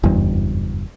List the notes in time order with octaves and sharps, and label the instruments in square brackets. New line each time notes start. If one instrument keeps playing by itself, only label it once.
[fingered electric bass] F#1 E2 G2